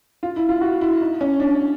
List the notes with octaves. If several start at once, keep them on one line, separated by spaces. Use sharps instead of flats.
F4
E4
F4
F#4
E4
D#4
C#4
D4